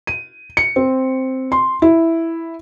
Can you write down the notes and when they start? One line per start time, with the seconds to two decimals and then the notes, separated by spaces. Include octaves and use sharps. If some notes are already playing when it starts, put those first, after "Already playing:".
0.07 D#7
0.57 C#7
0.76 C4
1.52 C6
1.82 E4